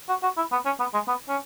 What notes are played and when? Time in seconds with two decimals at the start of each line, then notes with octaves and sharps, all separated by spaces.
0.09 F#4
0.23 F#4
0.37 E4
0.51 B3
0.65 C#4
0.79 B3
0.94 G#3
1.08 B3
1.29 C#4